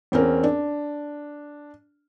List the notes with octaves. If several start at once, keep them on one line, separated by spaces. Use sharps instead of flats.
E2 C4 C#4 A#4
D4